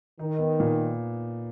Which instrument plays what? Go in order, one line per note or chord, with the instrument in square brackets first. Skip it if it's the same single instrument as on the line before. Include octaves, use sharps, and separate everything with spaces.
[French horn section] D#3 [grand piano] D#4
[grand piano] B3
A#2